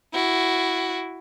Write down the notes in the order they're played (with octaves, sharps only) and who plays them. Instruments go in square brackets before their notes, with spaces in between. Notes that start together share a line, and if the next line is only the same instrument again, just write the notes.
[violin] E4 F#4